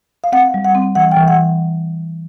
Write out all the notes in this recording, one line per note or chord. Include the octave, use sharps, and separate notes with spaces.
F5
C4 F#5
G3
F#5
C4
E3 F#5
G5
E3
F#5